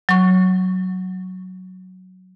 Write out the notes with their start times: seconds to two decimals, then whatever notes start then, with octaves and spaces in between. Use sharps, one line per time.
0.09 F#3 C#6